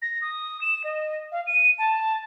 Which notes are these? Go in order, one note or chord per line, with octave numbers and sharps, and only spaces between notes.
A#6
D#6
E7
D#5
F5
D#7
A5